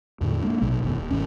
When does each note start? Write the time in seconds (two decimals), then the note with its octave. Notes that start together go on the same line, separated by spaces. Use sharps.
0.21 E2 A2 D3
0.42 G#3 A#3 D4
0.62 A#1 B2 F#3
0.83 F#1 D#2 B2
0.98 D#1
1.11 G1 D#2 G#2 C#4